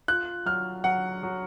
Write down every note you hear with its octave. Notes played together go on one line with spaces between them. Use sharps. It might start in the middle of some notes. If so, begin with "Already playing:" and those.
F4 F#6
F#3 F6
F#3 F#5
F#3